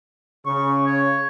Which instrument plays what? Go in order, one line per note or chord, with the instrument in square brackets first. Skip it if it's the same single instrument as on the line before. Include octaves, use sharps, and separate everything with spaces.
[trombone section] C#3 [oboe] C#6
[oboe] C#5